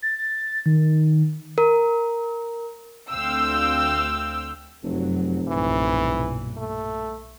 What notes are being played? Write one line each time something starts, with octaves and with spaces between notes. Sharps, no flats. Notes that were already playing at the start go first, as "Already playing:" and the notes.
A6
A6
D#3
A#4
D2 C4 F5 G5 E6
F1 F#2 F#3
B1 G2 A#2 E3
A3